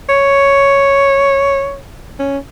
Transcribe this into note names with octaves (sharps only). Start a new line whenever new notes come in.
C#5
C#4